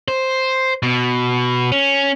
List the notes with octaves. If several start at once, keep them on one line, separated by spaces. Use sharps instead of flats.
C5
B2
C#4